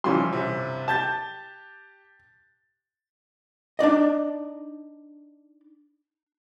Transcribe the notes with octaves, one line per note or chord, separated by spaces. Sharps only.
C#3 E3 F3 G3 C#4 C6
G1 C3
G4 A5 G6 A6
D4 D#4 D5 D#5